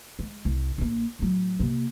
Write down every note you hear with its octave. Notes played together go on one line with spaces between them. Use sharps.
G#3
C2
A#1 A#3
A2 F#3
C3 A#3